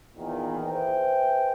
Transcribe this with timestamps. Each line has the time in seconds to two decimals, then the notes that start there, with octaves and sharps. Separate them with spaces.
0.17 E2 A#2 D#3
0.66 G#4 B4 C5 E5 G5